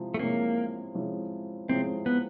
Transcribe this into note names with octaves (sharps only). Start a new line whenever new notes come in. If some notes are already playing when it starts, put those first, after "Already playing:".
Already playing: C3 F3 G#3 E4
A3
C3 F3 G#3 A#3 C#4 E4
C3 F3 G#3 C#4 E4
C3 F3 G#3 C4 C#4 E4
B3